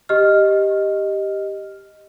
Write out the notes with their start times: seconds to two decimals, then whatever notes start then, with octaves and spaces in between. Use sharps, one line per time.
0.09 G4 D#5 F6